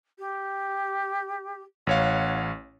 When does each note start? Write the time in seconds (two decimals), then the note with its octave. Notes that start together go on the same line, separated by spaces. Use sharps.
0.18 G4
1.87 A1 C#5 F5 F#5